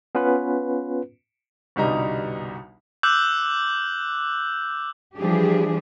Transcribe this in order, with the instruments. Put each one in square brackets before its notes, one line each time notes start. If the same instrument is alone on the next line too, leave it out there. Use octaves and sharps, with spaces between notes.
[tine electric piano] B3 C#4 F4 B4
[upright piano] G1 C2 B2 G3 D#4 A#5
[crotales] D6 E6 F#6 G6 F#7
[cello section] E3 F3 G3 D4 G4 G#4